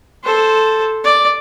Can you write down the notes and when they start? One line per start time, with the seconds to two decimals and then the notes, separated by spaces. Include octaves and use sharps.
0.24 A4 C5
1.04 D5